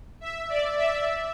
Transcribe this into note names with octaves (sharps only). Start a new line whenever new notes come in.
E5
D5
E5